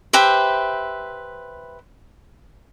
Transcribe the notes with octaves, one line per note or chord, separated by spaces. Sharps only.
G4 B4 C5 E5